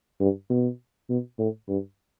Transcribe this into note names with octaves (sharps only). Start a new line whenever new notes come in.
G2
B2
B2
A2
G2